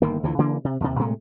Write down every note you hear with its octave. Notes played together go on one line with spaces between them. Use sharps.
G1 D#3 A#3
D2 D3 E3 F3
C#3 E3 A#3 D4
C3
D#2 C3
A2 C3 G#3 A3